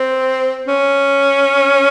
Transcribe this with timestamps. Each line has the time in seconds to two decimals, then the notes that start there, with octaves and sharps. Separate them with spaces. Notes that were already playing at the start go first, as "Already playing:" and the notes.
Already playing: C4
0.67 C#4